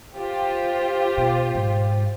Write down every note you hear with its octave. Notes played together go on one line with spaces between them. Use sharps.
F4 G4 C5
B2
G#2